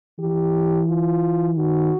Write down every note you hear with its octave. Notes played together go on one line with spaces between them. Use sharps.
E3 G4
F4
D#3 F#4